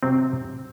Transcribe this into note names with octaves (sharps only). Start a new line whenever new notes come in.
C3 F#3 C4